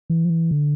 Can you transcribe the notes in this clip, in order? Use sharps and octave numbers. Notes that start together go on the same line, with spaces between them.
E3
F3
E3
D3